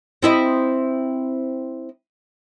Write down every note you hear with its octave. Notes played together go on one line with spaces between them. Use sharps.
C4 E4 D#5